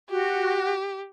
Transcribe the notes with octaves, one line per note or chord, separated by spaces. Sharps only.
F#4 G4